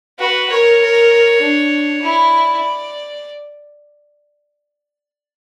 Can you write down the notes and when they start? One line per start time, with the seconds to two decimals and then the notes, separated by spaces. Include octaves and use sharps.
0.19 F#4 B4
0.50 A#4 C#5
0.81 A#4
1.41 D4
2.02 E4 D5